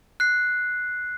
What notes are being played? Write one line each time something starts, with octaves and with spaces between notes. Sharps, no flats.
F#6 C7